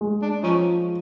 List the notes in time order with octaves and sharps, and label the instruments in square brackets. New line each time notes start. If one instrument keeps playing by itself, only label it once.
[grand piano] G#3
[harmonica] D4
[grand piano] F3 [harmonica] C#4 D#4